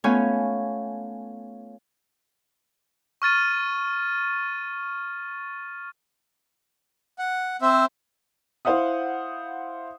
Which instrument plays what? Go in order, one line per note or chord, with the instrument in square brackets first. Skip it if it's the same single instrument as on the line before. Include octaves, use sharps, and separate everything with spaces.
[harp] A3 B3 C#4 F4 C#5 G#5
[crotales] C#6 F6 A6 D#7
[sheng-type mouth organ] F#5
C4 C5 E5
[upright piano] E4 C5 F5 F#5 D#6